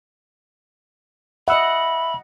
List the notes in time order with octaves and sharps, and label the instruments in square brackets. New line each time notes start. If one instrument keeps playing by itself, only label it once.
[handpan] D#5 F#5 [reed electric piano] E5 E6 [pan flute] B5